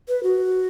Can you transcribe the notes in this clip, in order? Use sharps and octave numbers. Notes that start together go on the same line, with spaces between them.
B4
F#4